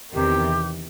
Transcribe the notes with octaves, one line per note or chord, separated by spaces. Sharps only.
E2 C3 D#3 G4